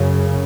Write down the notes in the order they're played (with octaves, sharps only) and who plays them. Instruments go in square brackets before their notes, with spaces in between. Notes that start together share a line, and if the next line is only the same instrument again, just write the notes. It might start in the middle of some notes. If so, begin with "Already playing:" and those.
Already playing: [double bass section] F#2 C#3